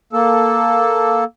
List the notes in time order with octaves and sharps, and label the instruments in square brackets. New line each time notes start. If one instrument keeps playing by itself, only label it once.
[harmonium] A#3 A4